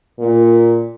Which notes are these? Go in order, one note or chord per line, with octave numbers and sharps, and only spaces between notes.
A#2